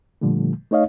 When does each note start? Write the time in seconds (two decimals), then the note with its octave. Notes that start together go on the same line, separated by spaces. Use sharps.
0.21 A#2 D3 F3 G3 A3
0.71 A3 D#4 C#5 D#5 F5